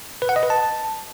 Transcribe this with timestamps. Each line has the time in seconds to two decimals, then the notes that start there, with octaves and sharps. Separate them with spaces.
0.22 B4
0.29 F#5
0.36 D#5
0.43 B4
0.50 A5